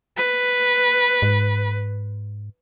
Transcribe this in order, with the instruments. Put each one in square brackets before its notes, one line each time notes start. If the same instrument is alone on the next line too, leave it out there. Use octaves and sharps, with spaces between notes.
[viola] B4
[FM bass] G#2